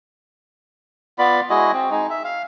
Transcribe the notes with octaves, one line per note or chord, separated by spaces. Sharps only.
B3 F4 D5 B5
G#3 E4 F#4 D#5
C4
G#3 D#4
E5
F5